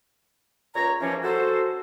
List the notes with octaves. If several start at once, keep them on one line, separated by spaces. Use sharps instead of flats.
C#2 A#2 C#5 A#5
D#2 E3 F3 G3 A#3 C#4
F#4 A4 C5